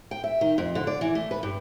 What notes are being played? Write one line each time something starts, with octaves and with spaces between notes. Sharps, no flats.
G5
E5
D#3
F2
D3
D5
E3
A3
B4
G2